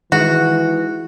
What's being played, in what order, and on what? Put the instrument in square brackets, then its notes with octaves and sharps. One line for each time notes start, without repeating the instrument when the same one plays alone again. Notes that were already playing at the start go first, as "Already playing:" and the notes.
[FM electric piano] D#3 G#3 [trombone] E3 [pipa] F#4